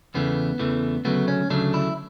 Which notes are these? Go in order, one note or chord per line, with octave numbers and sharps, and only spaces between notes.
E2 C#3 E3 A3 B3
E2 C#3 E3 A3
D2 C#3 F#3 A3 B3
C#4
D2 C#3 F#3 A3 D4
E4